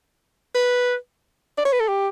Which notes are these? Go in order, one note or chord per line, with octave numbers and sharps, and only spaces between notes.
B4
D5
C#5
B4
A4
G4